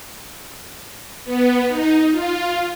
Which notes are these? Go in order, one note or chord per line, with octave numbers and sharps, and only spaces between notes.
B3
D#4
F4